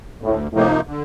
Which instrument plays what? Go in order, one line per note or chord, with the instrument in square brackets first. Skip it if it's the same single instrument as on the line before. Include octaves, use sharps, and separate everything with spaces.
[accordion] D2 [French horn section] A2
[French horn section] A2 [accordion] C3 F3 A#3 D#4
[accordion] D3